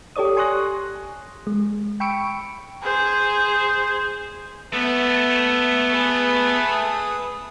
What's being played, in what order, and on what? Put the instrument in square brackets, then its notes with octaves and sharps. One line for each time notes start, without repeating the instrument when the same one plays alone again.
[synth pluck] G4 A4 C#5 D5 D#6
G#5 C6 C#6 D#6 F#6 A#6
G#3
G5 B5 C#6 E6 C#7 D7
[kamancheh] G#4 C5
[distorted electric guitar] A3 [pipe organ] B3
[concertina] G#4 B4 D#6